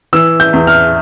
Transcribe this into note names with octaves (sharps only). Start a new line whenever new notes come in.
E3 E6
G6
E2
F6